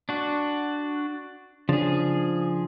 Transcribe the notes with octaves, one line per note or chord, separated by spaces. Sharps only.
D4 F#4
C#3 F3 D4 G#4 A6